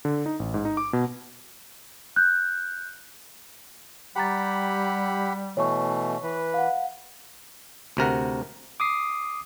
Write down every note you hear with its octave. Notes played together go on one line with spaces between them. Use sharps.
D3
D#4
A1
G#2
D#4
D6
B2
F#6 G6
G3 G4 F#5 G5 A#5 B5 A6
B2 E3 A3 C#5 C#6
E3 B4
F5 F#5
D2 C3 A#4 F#5
D6 D#6 C7